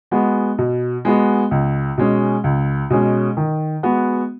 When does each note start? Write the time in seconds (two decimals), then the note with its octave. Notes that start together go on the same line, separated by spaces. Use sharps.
0.11 G#3 B3 F#4
0.58 B2
1.05 G#3 B3 F#4
1.51 C#2
1.98 B2 G#3 C#4
2.44 C#2
2.90 B2 G#3 C#4
3.37 D#3
3.83 G#3 B3 F#4